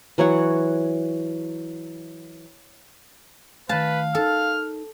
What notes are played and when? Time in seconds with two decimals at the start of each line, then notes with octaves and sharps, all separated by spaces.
0.18 E3 F#3 C#5 F#5
3.69 D#3 A3 B4 F5 A5
4.15 D#4 A4 A#4 F6